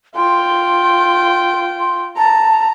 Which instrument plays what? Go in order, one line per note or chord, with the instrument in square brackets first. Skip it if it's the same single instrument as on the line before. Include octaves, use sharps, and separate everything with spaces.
[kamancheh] F4 G5 [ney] C6
[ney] C6
[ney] A5 [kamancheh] A#5